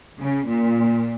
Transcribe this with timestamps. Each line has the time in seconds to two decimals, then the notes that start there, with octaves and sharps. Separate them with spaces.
0.20 C#3
0.48 A#2